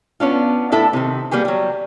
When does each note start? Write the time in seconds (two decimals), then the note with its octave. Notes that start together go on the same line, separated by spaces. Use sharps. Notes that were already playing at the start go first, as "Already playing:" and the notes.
0.20 B3 C#4 D4 F4
0.72 A2 D4 E4 A4 E5
0.93 C3 D#3
1.31 G3 A#3 B3 G4 G#4
1.45 F#3 G3